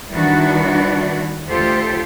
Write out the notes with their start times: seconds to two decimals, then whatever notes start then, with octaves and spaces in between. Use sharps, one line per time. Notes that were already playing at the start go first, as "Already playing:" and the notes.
0.11 D#3 G3 D4 E4 F#4 B4
1.49 D2 F4 G4 A4 C5